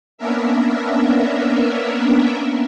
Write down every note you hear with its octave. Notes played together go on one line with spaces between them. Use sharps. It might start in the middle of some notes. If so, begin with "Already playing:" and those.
A#3 B3 C#4 D4 A#4 E5